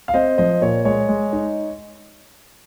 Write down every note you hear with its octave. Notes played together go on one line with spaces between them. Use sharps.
F5
C4 C5 D#5
F3 C5 D#5
A#2 C#5
G#3 C#5
G#3
D#4